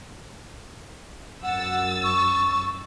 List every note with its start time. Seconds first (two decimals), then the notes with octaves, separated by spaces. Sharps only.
1.43 F#2 F#5 E6 A6
2.04 C#6